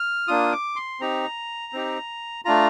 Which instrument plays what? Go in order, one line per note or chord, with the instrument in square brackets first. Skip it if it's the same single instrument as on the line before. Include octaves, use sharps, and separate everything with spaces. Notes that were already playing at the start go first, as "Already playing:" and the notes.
Already playing: [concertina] F6
A#3 D4 F4 D#6
D6
C6
C4 D#4 G4 A#5
C4 D#4 G4
A3 D4 F4 A#5